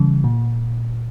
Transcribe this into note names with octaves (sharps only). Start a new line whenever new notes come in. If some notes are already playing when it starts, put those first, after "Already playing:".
Already playing: C#3 E3 G3
A#2